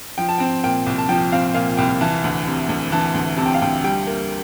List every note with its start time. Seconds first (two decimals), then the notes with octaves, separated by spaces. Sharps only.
0.18 F3 G5
0.29 A5
0.38 C4 G5
0.64 A#2 G5
0.86 C2
0.98 A5
1.09 F3 G5
1.32 C4 F5
1.54 A#2 F5
1.77 C2 G5
2.01 E3 A5
2.24 D2
2.47 C3
2.69 D2
2.92 E3 A5
3.15 D2
3.37 C3 A5
3.46 G5
3.54 F5
3.62 D2 G5
3.84 G3 G5
4.07 A#3